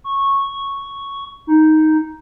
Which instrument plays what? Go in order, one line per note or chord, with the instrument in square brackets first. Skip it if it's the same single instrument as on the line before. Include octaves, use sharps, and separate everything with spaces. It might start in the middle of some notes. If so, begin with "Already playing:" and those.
[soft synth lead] C#6
D#4